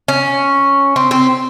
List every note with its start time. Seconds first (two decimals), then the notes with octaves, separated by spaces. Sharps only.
0.08 C#4
0.96 C4
1.11 C4